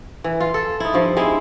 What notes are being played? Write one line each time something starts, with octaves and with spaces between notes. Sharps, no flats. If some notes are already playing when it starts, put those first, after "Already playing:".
E3
F4
A4
D#4 E4
G2 F3
G#3 C4 D#4 E4